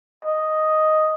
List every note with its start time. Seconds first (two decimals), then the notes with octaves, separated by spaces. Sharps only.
0.25 D#5